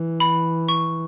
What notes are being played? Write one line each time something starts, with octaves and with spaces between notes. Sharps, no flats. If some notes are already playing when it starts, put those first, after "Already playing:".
Already playing: E3
B5
C#6